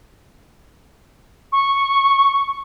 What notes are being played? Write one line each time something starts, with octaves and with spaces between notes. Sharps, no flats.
C#6